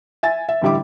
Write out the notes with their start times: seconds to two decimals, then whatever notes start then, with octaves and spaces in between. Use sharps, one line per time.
0.23 E5 G#5 A6
0.49 E5
0.62 A1 D3 G3 E4 D6